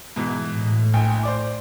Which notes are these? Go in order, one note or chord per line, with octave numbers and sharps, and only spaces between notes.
G#2 B2 E3
A2
A#1 G5 G#5
C5 D5 D6